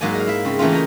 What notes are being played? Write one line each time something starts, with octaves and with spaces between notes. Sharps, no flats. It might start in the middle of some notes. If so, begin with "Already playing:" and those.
G#2 F#3 A#3 D5 G#5
D#5 F5
E4 E5
C#3 C4
E3 A3 A#3 C#4 F4
D#5 G5 G#5 A#5